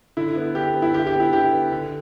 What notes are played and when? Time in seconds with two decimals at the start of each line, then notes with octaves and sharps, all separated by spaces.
0.17 D3 E4
0.36 B3
0.55 D3 G4
0.74 B3
0.82 E4
0.94 D3 G4
1.07 G4
1.14 B3
1.20 E4
1.33 D3 G4
1.53 B3
1.72 D3